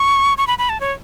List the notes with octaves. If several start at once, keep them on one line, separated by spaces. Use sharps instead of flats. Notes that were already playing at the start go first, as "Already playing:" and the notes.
Already playing: C#6
C#6
B5
B5
A5
C#5